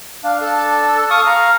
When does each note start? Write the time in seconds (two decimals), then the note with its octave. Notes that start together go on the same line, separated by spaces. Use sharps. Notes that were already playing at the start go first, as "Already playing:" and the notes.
0.23 D4 F5
0.40 A4
1.10 F5 C#6 D#6
1.26 F5 A#5